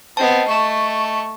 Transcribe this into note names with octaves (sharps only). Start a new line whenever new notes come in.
B3 C4 D#5 A5
A3 C#6